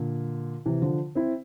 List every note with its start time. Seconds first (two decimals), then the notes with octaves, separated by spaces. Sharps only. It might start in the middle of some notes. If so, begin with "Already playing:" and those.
Already playing: A#2 D3
0.66 C3 E3
0.82 D3 F3
1.15 C4 E4